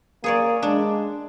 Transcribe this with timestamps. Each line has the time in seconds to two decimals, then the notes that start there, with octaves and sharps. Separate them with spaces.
0.24 A#3 G#4 C#5 D5
0.62 G#3 D4